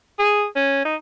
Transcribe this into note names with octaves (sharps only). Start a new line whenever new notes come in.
G#4
C#4
D#4